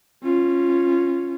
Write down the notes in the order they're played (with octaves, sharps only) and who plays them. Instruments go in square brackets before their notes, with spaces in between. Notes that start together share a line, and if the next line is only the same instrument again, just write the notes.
[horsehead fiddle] C#4 F4